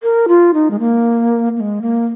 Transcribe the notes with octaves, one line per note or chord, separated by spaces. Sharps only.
A#4
F4
D#4
G#3
A#3
A#3
G#3
A#3